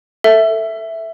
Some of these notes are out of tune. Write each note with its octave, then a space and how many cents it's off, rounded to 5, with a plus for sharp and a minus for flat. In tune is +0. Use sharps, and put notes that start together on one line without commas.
A4 +15 E5 +0